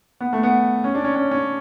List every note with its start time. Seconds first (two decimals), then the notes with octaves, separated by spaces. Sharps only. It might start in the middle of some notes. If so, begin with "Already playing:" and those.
0.21 B3
0.33 A3
0.43 B3
0.84 C#4
0.95 D4
1.04 C#4
1.16 C#4
1.31 C#4